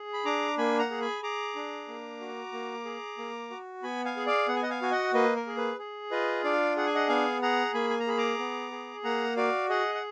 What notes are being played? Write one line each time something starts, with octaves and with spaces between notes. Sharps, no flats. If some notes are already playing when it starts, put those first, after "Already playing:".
Already playing: G#4
B5
D4 A#5 D6
A#3 G#5 B5
F#5 A#5
G#4
G#5 B5
G#4 A#5 D6
D4
A#3
F#4
A#3
G#4
A#3
F#4
B3 G#5 B5
F5 G#5
G#4
D5 F5
B3 F#5
G#5
D#5 F#5
F5 G#5
F#4 G#5
D#5 F#5
A#3 B4 D#5
A#4
G#4
B4
G#4
F4 B4 D#5
D4 D5 F5
G#4 F#5
G#5
D#5 F#5
B3 F5 G#5
G#4 F#5 A#5
A#3 G#5 B5
G#5
A#5
G#4 B5
A#5 D6
B3
G#4
A#3 F#5 A#5
F#4 D5 F5
G#4 D#5 F#5
F#5